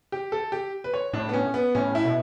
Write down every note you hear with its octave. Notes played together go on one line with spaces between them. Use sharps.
G4
A4
G4
B4
C#5
A2 D4
B3
C#4
B3
A2 C#4
E4
B2